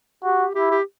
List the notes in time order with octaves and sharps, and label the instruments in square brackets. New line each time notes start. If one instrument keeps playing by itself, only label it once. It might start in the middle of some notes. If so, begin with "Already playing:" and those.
[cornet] F#4 [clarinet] G4
[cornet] E4 [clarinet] G4
[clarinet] G4